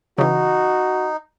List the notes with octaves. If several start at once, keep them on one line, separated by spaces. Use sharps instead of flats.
C#3 E3 D#4 F#4